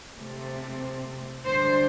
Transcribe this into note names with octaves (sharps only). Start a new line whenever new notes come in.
C3 A3 C4
D2 D3 G3 D4 C5